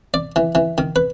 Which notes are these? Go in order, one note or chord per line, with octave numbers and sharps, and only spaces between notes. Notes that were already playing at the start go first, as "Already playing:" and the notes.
D5
E3
E3
D#3
B4